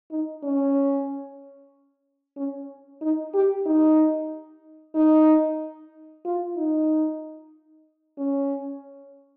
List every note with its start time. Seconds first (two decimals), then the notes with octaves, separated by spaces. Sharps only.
0.11 D#4
0.44 C#4
2.37 C#4
3.02 D#4
3.34 G4
3.67 D#4
4.95 D#4
6.25 F4
6.57 D#4
8.18 C#4